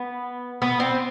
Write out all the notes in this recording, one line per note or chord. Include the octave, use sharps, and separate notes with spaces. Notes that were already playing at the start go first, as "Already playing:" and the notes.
Already playing: B3
B3
C4